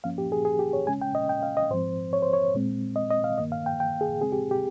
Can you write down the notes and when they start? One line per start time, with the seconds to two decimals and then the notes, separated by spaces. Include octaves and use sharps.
0.04 G2 F3 A#3 C#4 F5
0.18 G4
0.32 G#4
0.45 G#4
0.59 G4
0.73 C#5
0.87 C#3 G#3 C#4 G#5
1.02 G5
1.15 D#5
1.29 G5
1.43 F5
1.57 D#5
1.70 G#2 F3 C4 C5
2.13 C#5
2.22 C5
2.33 C#5
2.55 A#2 G#3 C4
2.96 D#5
3.10 D#5
3.24 F5
3.38 G2 D#3 A#3 D#5
3.52 F5
3.66 G5
3.80 G5
4.01 G#4
4.21 C#3 G#3 C4 G#4
4.32 G4
4.51 G4